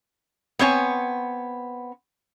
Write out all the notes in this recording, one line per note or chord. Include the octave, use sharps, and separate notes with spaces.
B3 C4 C#5 G#5